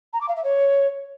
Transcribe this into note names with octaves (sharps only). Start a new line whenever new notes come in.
A#5
D6
F5
E5
C#5